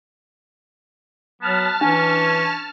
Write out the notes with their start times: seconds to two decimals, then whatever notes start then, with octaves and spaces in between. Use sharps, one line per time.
1.42 F#3 B3 A5 F6
1.81 E3 C#4 D4